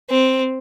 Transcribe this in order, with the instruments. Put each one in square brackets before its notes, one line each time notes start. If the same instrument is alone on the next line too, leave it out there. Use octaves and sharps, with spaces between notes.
[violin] C4